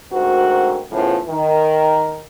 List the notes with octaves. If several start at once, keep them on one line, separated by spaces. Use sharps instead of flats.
D2 G#2 C4 F#4 A#4
E2 A2 C#3 F3
D#3